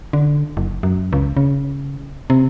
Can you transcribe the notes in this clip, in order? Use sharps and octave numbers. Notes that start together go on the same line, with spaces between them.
D3
F#1
F#2
C#2
C#3
C3